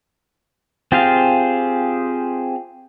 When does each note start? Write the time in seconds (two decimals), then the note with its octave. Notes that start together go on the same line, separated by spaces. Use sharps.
0.92 C4 F4 G4 G#4 F5